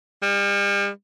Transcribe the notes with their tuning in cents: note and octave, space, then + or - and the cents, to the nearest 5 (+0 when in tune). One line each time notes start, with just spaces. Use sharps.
G3 +40